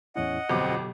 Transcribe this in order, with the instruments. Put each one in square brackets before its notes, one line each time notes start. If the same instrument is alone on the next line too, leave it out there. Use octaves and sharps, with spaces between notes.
[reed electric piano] E2 A2 E4 [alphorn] C#4 [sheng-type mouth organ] D#5 F#5
[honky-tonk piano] G1 F2 D6 [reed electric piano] B2 F#3 G4 [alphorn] C4